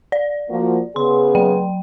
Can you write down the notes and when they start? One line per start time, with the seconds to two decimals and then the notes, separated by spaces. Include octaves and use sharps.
0.12 D5
0.49 F3 A#3 F#4
0.96 C#3 B3 G#4 C6
1.35 F#3 G5